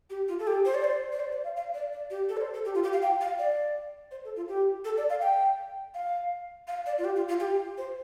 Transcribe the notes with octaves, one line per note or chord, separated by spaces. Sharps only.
G4
F4
A4
G4
C5
D5
C5
D5
C5
D5
F5
F5
D5
D5
G4
A4
D5
C5
A4
G4
F4
G4
F5
G5
F5
D5
C5
A4
F4
G4
A4
D5
F5
G5
F5
F5
D5
F4
G4
F4
F4
G4
C5